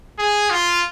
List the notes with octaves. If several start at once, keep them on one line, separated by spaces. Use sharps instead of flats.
G#4
F4